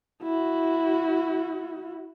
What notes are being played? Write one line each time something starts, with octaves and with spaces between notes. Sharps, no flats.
E4 F#4